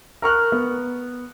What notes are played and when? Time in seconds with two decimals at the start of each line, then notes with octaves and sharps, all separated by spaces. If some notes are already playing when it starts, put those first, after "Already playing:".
0.22 A#4 C#6 F6 F#6
0.52 B3